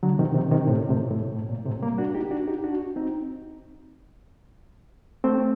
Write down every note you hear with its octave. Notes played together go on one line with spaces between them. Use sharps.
D3 F#3
C3 D#3
C3 D#3
C3 D#3
A2 C3
A2 C3
A2
A2
A#2
A2 C3
G3 A#3
D4 F#4
D#4 G4
D4 F#4
D#4 G4
D4 F#4
C4 D#4
A3 C4